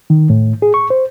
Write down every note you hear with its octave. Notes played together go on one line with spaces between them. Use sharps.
D#3
A2
G#4
C#6
C5